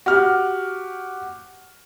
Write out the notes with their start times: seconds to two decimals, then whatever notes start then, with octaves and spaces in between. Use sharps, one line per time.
0.06 F#4 G4 F6